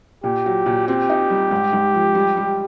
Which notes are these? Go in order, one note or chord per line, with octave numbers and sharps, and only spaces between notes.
A#2 G4
F#3
A#2
C4 G4
D#4
G3
G#2
G#2
F3
G3
G3